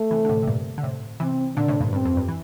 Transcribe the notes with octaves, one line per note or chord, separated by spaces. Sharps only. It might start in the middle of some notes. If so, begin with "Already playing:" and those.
Already playing: A3
C3 E3
D3
A2 C3
C3
G2 A#2
D3
A2 C3
C3 E3 C4
A#2 D3 D4
A2 C3
G2 A#2
G2 C4
F2
G2
E3